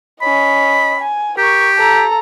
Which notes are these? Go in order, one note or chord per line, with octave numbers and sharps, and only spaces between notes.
C#4 D#5 B5
G#5
G4 A#4 C#6
A4 A#5